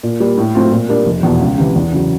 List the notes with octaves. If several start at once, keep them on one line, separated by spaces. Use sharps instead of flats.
A#2
G3 A#3
A2
F#3 A3 C4 F4
A#2
G3 A#3 D4
F1
E2 B2
C#2
C3 E3
E2
C#3 F#3